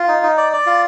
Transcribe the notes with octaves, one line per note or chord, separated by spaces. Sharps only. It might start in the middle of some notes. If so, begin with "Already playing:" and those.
Already playing: F4
D#4
D#4
D5
D5
F4